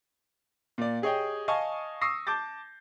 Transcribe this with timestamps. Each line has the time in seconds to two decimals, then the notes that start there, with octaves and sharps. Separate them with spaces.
0.78 A#2 D5
1.02 G4 G#4 C#5 D#5 G5
1.48 D#5 F5 G#5 A5 C#6 D#6
2.01 C#6 D#6 E6 A#6 C7
2.27 A5 D6 G6 A6